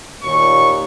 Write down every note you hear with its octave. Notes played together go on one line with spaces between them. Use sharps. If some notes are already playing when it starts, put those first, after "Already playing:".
D#2 A#2 C#6